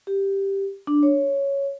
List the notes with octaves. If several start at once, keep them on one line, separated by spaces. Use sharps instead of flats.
G4
D4
C#5